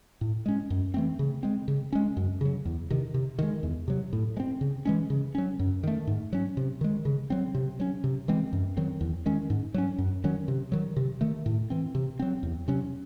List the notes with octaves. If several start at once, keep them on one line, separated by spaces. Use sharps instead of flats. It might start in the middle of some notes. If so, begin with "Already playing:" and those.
A2
G#3 C#4
F#2
E3 A3 C4
C#3
G#3 C4
C#3
G#3 C#4
F#2
C#3 F#3
E2
C3 D#3
C3
D#3 G#3
E2
C3 F#3
A2
G#3
C4
C#3
E3 G#3 C#4
C#3
F#3 C#4
F#2
D#3 A3
G#2
F#3 C#4
C3
D#3 G#3
C#3
F#3 C4
C3
F#3 C#4
C3
E3 G#3 C4
F#2
D#3 F#3 C4
E2
D#3 G#3 C#4
G#2
F#3 C#4
F#2
D#3 F#3 C#4
C3
D#3 F#3
C3
D#3 A3
A2
E3 C4
C3
F#3 C4
E2
C3 F#3 C#4